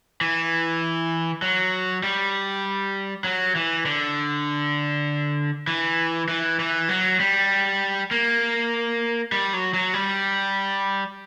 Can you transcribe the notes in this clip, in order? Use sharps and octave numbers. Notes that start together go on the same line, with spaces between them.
E3
F#3
G3
F#3
E3
D3
E3
E3
E3
F#3
G3
A#3
G3
F#3
F#3
G3